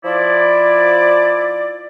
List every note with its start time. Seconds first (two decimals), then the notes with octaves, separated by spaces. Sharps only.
0.04 F3 E4 D5